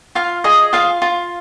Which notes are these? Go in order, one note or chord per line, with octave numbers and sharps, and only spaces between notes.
F4 F5
G#4 D#5
F4 F5
F4